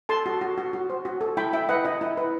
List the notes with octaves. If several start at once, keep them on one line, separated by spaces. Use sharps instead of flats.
A4 A5 C6
F#4
F#4
F#4
F#4
C5
F#4
A4
E4 G5 B5
E4 E5 G5
B4 D#5 F#5
E4 D#5
E4
B4